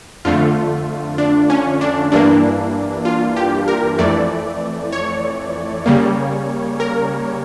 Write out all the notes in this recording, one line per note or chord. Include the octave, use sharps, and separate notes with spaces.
F2 D3 A3 F4
D4
C#4
D4
G2 E3 A#3 D4
F4
G4
A#4
F2 E3 A3 D5
C#5
C#3 G3 A#3
A#4